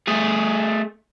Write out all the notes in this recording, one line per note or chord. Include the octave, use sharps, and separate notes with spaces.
A3 G#4